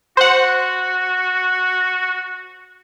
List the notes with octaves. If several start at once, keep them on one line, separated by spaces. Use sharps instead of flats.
F#4 C5 F#5